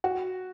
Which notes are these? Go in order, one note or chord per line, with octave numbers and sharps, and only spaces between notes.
F#4